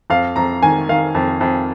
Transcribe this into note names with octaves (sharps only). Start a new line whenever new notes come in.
F2 F5
F2 A#5
D#3 G#5
D#3 F5
F2
F2